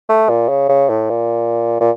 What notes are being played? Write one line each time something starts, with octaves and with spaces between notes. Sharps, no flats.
A3
A#2
C#3
C#3
A2
A#2
A#2